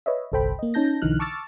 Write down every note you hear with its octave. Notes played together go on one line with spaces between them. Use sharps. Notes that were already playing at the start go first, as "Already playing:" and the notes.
B4 C#5 D#5 E5
G1 C2 A4 C5 G5 B5
A#3 D#5
C#4 D#4 A5 G6 A#6
B1 D3 E3 D#4 F6 F#6
A5 C#6 D6 E6 F6 A6